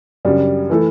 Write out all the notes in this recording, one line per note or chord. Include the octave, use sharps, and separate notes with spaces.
F#2 C#3 G3 D4
E3 A3 E4 A4